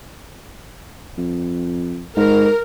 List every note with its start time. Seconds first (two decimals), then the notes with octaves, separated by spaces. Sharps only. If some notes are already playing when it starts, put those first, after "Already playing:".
1.17 F2
2.17 G#2 A#4